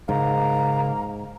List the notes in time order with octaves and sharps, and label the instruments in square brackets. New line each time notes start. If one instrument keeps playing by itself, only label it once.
[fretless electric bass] G#2 [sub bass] C#3 [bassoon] A#3 [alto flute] A#5